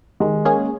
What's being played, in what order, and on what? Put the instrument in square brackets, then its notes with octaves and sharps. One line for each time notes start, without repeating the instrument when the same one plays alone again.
[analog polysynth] D#3 [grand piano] G#3
[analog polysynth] A#3 C#4 G#4